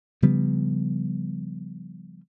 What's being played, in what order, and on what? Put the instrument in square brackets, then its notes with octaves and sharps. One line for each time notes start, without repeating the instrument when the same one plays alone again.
[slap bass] C#3 F3 G3 B3